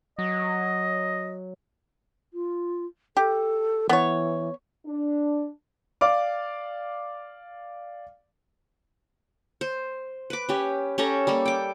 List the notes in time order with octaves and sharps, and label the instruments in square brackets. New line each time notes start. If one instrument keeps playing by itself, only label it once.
[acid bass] F#3 [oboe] D#5
[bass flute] F4
[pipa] G4 [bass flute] A4
[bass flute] E3 [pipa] B3 C#5
[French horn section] D4
[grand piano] D5 F5 D6
[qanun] C5
B4 D6
C#4 G4
C#4 G4 A4 A#5
G3 A#3 A4
G5 D6